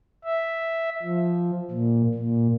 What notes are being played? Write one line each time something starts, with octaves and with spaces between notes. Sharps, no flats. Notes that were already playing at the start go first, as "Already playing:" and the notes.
E5
F3
A#2
A#2